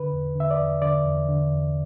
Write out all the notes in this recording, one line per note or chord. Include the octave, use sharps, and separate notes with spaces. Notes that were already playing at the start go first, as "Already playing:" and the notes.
Already playing: D3 B4
E2
D3 E5
D5
E2
D3 D5
E2
D3
E2